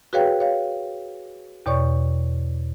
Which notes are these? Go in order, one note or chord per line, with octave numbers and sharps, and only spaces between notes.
F#4 G#4 B4 C#5 F5 G5
C#5 F5
E2 B2 C#5 D5 C#6